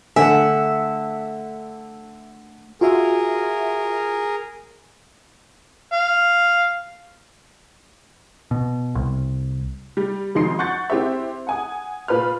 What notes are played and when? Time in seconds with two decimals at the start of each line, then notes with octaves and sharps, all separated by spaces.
0.16 D3 A3 E5 F#5 G#5
2.81 F4 F#4 G#4 A#4 E5
5.93 F5
8.51 B2
8.95 C2
9.97 G3
10.35 G#1 F2 D#4 C6 C7
10.59 F#5 C#6 F#6 G6 A6 C#7
10.90 C4 E4 G4 C5 E5
11.47 F#5 G#5 D#6
12.08 A#2 F4 B4 B5 F6